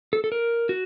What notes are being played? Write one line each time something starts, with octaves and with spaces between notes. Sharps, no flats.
A4
A4
A#4
F#4